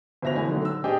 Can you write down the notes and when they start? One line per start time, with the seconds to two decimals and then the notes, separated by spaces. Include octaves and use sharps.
0.22 G1 B2 E5 A#6 F7
0.35 D3 A3 E4 G#5
0.47 D3 D#3 F#3
0.65 E6
0.84 D4 G4 G#4 D#5 G5